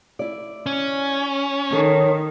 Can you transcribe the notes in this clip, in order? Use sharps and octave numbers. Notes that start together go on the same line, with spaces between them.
E4 D5
C#4
D#3 A4 C#5